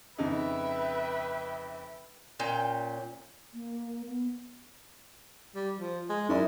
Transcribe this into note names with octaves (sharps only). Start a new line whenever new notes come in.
F2 C#3 D#4 B4 E5 G5
A#2 C#4 G5
A#3
B3
G3
F3
G#3
F#2 D#4 E4 D5